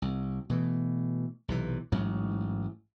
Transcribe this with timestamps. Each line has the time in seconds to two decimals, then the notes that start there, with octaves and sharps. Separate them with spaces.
0.02 C2
0.49 B2 E3 A3
1.48 B1 C3 E3
1.92 A1 G#2 F#3